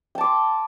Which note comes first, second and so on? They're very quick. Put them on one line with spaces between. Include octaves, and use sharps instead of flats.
G5 A5 D6 C6